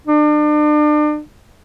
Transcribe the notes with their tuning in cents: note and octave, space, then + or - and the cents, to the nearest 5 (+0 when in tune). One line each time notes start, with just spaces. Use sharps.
D4 +35